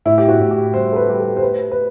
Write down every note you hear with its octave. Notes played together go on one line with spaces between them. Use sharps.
A2 E4
G4
F#4
A2
G4
G3 C5
A4
B4
G3 G4
A4
C5
A3 B4
B4